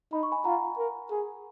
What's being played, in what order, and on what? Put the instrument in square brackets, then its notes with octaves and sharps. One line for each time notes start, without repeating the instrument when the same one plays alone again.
[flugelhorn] D#4 [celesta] B5
[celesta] C#6
G#5 B5
[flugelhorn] F4 [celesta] F#5 A#5
[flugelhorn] A#4
G#4